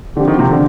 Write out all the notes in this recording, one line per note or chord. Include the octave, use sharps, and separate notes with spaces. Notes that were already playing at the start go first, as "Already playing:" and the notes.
D3 F3 C4 G4
D#3
C3
D3